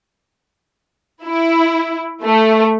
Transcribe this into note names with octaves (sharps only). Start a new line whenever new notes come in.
E4
A3